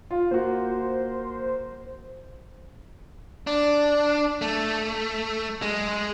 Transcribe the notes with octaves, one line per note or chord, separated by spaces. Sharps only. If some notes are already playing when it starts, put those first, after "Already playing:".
F4
A#3 F#4 C5
D4
A3
G#3